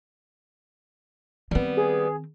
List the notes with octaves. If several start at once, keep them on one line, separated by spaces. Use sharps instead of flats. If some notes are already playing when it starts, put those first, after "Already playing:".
D#3 G3 B3 C4
G#4